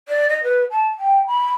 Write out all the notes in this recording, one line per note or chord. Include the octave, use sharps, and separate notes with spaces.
D5
D#5
B4
A5
G5
B5